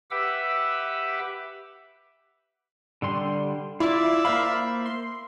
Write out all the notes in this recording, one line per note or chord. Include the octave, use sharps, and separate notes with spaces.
G4 B4 E5 F#5 D6 E6
D3 G3 C6
E4 F4 D5 E5
A#3 C5 F5 B5
C6